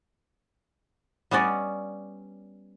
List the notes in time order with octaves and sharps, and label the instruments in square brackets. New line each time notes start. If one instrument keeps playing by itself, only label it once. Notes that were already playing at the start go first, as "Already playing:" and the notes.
[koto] G3 B3 C#4 D5 D#5